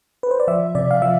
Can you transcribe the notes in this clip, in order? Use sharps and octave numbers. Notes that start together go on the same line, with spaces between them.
B4
C5
D5
F3 E5
C3 D5
F5
F3 E5